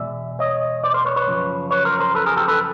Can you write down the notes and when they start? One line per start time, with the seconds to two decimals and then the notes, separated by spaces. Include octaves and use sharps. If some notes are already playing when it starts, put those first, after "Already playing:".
Already playing: E2 B2 G#3 D5 E5
0.39 C#5 D#5
0.84 C5 D5
0.94 A#4 C5
1.05 B4 C#5
1.16 B4 C#5
1.28 F#2 C#3 F3
1.71 B4 C#5
1.85 A#4 C5
2.00 A#4 C5
2.15 A4 B4
2.26 G#4 A#4
2.37 G4 A4
2.48 A4 B4